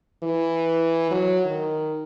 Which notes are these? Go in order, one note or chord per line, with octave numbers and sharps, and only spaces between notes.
E3
F#3
D#3